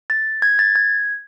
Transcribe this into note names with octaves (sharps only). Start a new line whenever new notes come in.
A6
G#6
A6
G#6